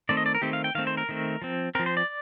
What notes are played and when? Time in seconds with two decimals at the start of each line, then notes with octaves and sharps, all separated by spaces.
0.09 D#3 A3 C4 D5
0.17 D#5
0.26 D5
0.35 A#4
0.42 D#3 A3 C4 G4
0.53 F5
0.64 G5
0.75 D#3 A3 C4 F5
0.87 C5
0.97 A#4
1.09 D#3 A3 C4
1.42 F3 C4
1.75 C4 A#4
1.79 F3
1.86 C5
1.97 D5